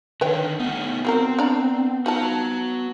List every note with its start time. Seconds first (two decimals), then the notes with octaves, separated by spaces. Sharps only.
0.21 D3 D#3 B4 C#5 G5
0.60 A3 B3 C#4 D#4
1.05 F#3 A#3 C4 A#4
1.39 D4 D5 A#5
2.06 D#4 F4 F#4 A5 A#5